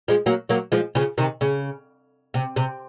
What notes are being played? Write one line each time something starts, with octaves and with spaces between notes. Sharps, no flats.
F3 G#3
F#3 A#3
F#3 A#3
F3 G#3
C#3 F3
C3 D#3
C#3
C3
C3